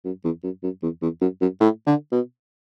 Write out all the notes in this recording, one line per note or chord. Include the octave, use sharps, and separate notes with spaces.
F#2
E2
F#2
F#2
E2
E2
F#2
F#2
A2
D3
B2